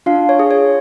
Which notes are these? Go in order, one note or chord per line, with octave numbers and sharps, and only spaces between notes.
D4 F4 F5
C#5
G#4
C#5